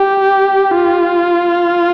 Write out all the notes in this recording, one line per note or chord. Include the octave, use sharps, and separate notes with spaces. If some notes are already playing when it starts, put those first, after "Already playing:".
Already playing: G4
F4